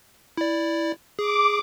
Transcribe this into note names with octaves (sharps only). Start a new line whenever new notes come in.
E4 D5
G#4 D6